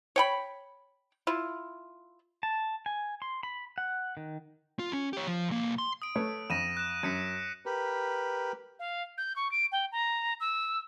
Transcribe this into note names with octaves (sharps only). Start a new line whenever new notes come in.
C#5 G5 B5
E4 F4
A5
G#5
C6
B5
F#5
D#3
F4
C#4
G4 C#5
F3
B1 A#3
C6
D#6 D7
A3 B4 C#5
F2 A#6 D#7 E7
F#6 E7
F#2 B6 C#7 D#7
G4 A#4 B4
F5
G6
C#6
D7
G5
A#5
E6